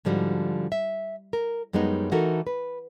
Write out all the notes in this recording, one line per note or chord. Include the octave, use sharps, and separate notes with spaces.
G#2 D3 F3 G3 F#4
E5
A#4
F#2 G3 G#3 B3 D#4
E3 A3 D#4 F#4 A4 A#4
B4